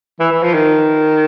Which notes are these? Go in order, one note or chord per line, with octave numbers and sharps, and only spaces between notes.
E3
E3
F3
D#3